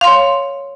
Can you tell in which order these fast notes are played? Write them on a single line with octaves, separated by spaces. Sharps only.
F5 C6 C#5